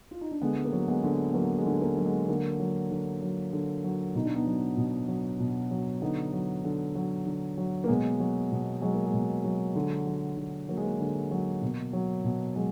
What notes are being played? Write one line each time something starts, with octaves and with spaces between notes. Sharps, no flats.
F4
D#4
D4
D3 G#3 B3
G#3
A#3
F#3
G#3 B3
D3
B3
F#3 A#3
G#3
D3
A#3
F#3
G#3
D3 A#3
F#3
D3
F#3
D3
F#3
B2 D#4
D4
B3 D#4
F#3
B2
F#3
B2
F#3
D3 B3 D#4
F#3
D3
F#3
D3
F#3
A#3
B2 G#3 B3
F#3
B2
F#3 G#3
A#3
G#3
B2
F#3
D3
F#3
D3
F#3 A#3
G#3
A#3
D3
F#3
B2
F#3
B2
F#3 G#3